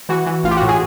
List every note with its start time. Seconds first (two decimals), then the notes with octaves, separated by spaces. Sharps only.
0.09 E3 F#4
0.26 E3
0.44 A1 F4
0.51 G4
0.57 F#4
0.62 A2
0.68 G#4